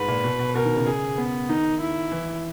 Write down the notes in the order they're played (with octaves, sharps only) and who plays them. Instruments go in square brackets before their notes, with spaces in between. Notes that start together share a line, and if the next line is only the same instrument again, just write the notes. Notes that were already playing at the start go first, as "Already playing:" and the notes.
Already playing: [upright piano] G#2 [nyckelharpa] B4
[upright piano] A#2
B2
B2
[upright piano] B2 [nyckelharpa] A#4
[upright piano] D#3
C#3
[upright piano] C#3 [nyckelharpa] G#4
[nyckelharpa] B3
[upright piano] D#3 [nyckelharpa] D#4
[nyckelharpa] E4
[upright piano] E3